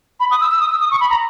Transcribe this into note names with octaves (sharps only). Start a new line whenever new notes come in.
B5
D#6
E6
E6
D#6
E6
D#6
C#6
B5
A#5